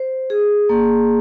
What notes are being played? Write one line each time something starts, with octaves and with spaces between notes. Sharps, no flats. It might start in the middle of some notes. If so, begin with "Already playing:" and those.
Already playing: C5
G#4
A#3